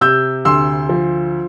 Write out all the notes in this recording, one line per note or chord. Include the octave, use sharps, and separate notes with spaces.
C3 E6 G6
D2 C6 E6
F3